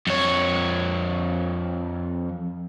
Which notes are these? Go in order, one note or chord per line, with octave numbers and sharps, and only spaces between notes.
F2 C#5